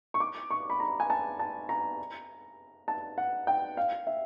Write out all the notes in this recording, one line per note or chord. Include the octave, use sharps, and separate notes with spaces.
C#6
D6
C#6
B5
A#5
G#5
A5
A5
A#5
A5
F#5
G5
F5
E5